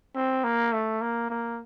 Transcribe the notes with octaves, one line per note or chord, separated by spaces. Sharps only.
C4
A#3
A3
A#3
A#3